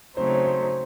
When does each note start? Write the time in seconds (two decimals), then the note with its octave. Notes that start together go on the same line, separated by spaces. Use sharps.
0.17 C#3 F#3 A3 C4 D#4 C5
0.26 C#5
0.35 C5
0.45 C5